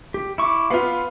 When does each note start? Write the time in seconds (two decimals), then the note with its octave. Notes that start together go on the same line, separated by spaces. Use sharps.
0.14 G4
0.38 E4 C#6 D6
0.70 B3 F4 F5 B5